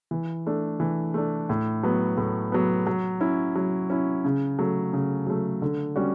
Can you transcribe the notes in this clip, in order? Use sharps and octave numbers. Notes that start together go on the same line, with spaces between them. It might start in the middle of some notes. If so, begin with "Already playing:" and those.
E3
A3 D4
E3
A3 D4
A2
F#3 B3
A2
F#3 B3
F#3
C#4 E4
F#3
C#4 E4
C#3
F#3 A3
C#3
F#3 A3
D3
G3 C#4 F#4